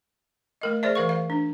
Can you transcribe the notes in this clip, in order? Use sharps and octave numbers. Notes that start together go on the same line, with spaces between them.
A3 A#4 D#5
G#4 C5 D5 E5
E3 A#4 F5 C#6
F5
D4